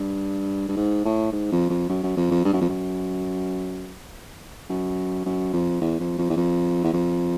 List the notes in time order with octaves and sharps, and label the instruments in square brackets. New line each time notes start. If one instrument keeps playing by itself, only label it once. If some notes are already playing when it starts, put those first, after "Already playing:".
Already playing: [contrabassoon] G2
G2
G#2
A2
G#2
F2
F2
F#2
F#2
F2
F2
G2
F#2
F2
F#2
F#2
F#2
F2
E2
F2
F2
E2
F2
E2
F2